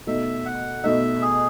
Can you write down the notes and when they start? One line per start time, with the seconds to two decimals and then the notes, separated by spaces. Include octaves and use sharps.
0.07 B2 A3 D#4 E5
0.46 F#5
0.83 B2 A3 D#4 E5
1.22 G#4